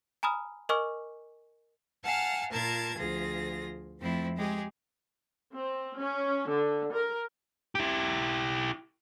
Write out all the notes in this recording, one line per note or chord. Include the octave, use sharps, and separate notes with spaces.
G#5 A#5 B5 D#6 F6
A#4 D#5 G#5 C#6 D6 F6
F5 F#5 G#5 A5 F6
A#2 F4 A#4 A5 G#6 A6
D2 F3 F4 G#4 A#6
F2 F3 A3 C4 E4
G#3 G4 G#4
C4
C#4
D3
A#4
E4 G4